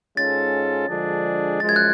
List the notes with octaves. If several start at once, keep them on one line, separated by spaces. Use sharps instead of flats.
G#2 G#3 C#4 F4 A4 A6
D3 F3 G#3 D4 G#4
F#2 F3 G#3 A6
G#6
F#6